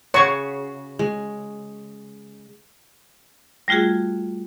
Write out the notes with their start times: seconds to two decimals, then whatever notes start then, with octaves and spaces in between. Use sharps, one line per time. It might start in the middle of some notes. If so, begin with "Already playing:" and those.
0.14 C#3 F#4 C#5 C#6
0.99 G#3
3.68 G3 A3 F4 F#4 G#4